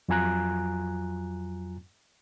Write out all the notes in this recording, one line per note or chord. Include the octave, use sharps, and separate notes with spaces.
F2 F#3 F4 G#5 A#5 F#6